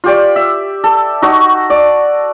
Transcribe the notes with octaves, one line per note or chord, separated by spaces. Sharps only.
F4 G4 D5
E5
A4
D#4 F#4 C#6
D5